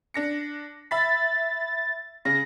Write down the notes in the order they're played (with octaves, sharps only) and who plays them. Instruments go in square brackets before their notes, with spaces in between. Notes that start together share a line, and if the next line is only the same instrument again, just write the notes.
[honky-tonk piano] D4 A#6 C#7
[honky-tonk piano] E5 B5 B6 [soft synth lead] A6
[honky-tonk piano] C#3 [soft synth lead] A#6